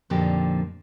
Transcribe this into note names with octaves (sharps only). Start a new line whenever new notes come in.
F2 A#2 D3 F3 D#4 G4